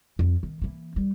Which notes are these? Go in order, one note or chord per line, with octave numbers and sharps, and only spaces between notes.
F2
D#3
E3 A#3
G3